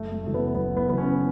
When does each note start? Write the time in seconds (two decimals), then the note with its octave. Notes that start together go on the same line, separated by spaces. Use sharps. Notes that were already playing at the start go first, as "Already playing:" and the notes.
Already playing: F#1 A3
0.12 A3
0.23 F#2 C#3 E3 A3
0.34 B3
0.55 F#1 B3
0.77 B3
0.88 F#2 C#3 E3 B3
0.98 C#4